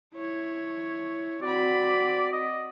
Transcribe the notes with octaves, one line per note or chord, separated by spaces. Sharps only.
E4 C#5
C4 F#4 D5 B5
D#5